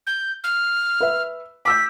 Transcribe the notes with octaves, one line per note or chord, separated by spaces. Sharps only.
G6
F6
B4 E5
D6 E6 G6 B6